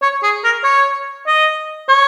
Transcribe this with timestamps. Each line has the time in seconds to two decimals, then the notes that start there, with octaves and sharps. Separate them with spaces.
0.02 C#5
0.23 G#4
0.44 A#4
0.64 C#5
1.27 D#5
1.89 C#5